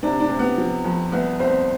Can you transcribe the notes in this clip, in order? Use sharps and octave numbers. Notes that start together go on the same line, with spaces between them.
C3 D4
D4
C3
B3
F3
F2
C2 B3
C2 C4